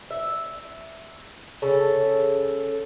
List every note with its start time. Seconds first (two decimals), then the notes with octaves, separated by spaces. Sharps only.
0.11 E5
1.62 C#3 A4